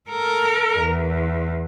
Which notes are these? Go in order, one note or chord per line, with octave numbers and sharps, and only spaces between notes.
A4 A#4
E2